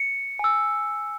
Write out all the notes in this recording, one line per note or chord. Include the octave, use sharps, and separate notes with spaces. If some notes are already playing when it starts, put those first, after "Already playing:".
Already playing: C#7
G#5 E6